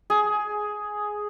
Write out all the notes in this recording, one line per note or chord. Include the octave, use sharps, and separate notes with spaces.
G#4